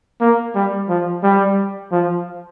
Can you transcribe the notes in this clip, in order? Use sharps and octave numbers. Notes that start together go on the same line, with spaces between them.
A#3
G3
F3
G3
F3